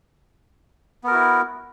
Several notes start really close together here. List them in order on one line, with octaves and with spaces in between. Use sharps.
B3 A#4 F#4 E4